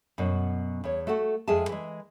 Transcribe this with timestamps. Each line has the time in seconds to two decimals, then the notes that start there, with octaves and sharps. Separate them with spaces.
0.18 F#2 B2
0.84 E2 C#5
1.07 A3 F#4 A4 F#5
1.48 F2 G#3 G#4 E5 G#5 A5
1.69 E3 G#3